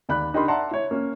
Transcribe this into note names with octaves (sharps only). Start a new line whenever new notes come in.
D#2 D5 B5 F#6
D4 D#4 G4 A#4 B5 C6
D5 E5 F#5 A5 A#5 C6
E4 C#5
A#3 C#4